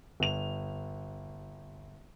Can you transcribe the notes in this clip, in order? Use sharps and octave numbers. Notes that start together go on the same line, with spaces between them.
G1 F7